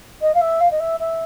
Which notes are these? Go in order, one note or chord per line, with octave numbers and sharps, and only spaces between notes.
D#5
F5
E5
F5
D#5
E5
E5